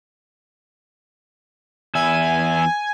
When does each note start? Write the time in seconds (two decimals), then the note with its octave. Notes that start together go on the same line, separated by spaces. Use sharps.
1.95 E2 E5 G#5